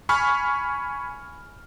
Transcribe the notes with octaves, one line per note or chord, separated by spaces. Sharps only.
G#5 B5 C#6 F6